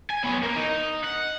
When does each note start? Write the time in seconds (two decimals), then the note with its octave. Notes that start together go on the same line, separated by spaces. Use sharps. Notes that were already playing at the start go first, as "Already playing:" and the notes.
0.11 G#5
0.24 B3 C#5
0.43 A#3 A#4
0.56 D#4
1.04 F#5